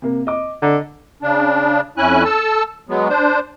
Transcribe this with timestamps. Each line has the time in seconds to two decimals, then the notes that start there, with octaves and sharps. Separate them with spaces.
0.02 C3 A#3
0.27 D#5 D6
0.62 D3 D#5 A#5
1.23 C#3 D4
1.98 F2 C#4 E4 G#5 F#6
2.25 A4 A5 E6
2.89 F#3 G#3 B3
3.09 D4 C5